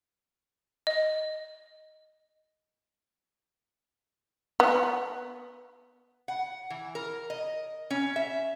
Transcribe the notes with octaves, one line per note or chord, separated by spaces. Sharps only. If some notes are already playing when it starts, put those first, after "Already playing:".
D#5
B3
F#5
E3
A#4
D#5
C#4
E5